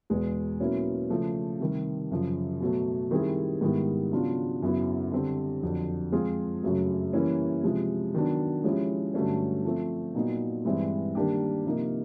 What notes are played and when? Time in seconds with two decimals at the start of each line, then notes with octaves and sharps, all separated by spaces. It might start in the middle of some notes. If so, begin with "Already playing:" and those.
0.10 E2 B2 G#3
0.60 B2 F#3 A#3 C#4 E4
1.10 C#3 F3 A3
1.60 C3 D#3 G3
2.11 F#2 C#3 F3
2.61 B2 F#3 A3
3.11 D#3 G3 C4 E4 G#4
3.61 G#2 D#3 G3 B3 E4
4.12 C#3 F#3 B3 D4 F4
4.62 F#2 C#3 F#3 B3 E4
5.12 D3 G3 C4
5.63 F2 D3 F#3
6.12 F3 G#3 C4 F4 G#4
6.63 F#2 C#3 F#3 A3
7.13 E3 G3 A#3 C#4 E4
7.63 C3 F3 G#3
8.14 D#3 F#3 B3 D4
8.64 F3 G#3 C#4 E4 G4
9.14 G2 D3 F#3 A3 C#4
9.65 F3 A3 C4
10.15 A#2 F#3 B3 D#4
10.65 G2 E3 G#3 C4
11.15 D#3 G3 A#3 D4 G4
11.66 C3 F3 A#3 D#4